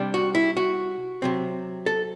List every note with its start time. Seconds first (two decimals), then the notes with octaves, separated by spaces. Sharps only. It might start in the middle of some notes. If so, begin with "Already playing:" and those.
Already playing: C3 G3 D4
0.14 F#4
0.35 E4
0.57 F#4
1.22 C3 F#3 C4
1.86 A4